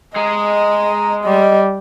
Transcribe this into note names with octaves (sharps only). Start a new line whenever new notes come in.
G#3 G#4 D#5 A#5
G3 D#5